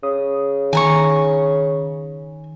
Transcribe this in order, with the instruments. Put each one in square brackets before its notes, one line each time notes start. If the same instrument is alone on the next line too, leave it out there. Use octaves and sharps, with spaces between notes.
[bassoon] C#3 [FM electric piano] D#6
[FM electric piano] D#3 [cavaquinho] G#5 A#5 C#6